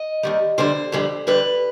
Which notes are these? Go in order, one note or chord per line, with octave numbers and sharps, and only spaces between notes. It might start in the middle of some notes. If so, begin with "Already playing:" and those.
Already playing: D#5
D#2 D#3 G3
F2 D3 G3 C5
F2 D3 G3
F2 D3 G3 B4